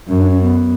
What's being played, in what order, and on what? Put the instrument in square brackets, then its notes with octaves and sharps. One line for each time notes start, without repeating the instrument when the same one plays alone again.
[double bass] F#2 [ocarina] C#4
[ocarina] D4
C#4
B3